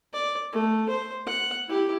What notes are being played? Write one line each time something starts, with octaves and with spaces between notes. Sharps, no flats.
D5
A3
C5
F#5
E4 G4